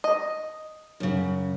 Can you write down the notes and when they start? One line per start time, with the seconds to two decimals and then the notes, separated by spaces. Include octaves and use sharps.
0.04 D#5
1.00 F#2 C#3